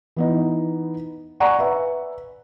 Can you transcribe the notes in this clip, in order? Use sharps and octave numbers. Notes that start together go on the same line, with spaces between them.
E3 B3 D#4
D5 F#5 G#5 A#5 C#6
B4 E5